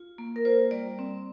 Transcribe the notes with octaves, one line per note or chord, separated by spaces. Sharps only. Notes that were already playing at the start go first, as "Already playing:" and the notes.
Already playing: F4
A#3
A#4
F4 C5
G3 D5
C4